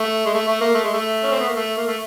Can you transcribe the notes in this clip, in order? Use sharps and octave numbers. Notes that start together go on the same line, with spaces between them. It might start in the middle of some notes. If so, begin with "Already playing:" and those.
Already playing: A3
G#3
A3
A3
A#3
A3
G#3
A3
C#4
C4
B3
A#3
A3
A#3
A3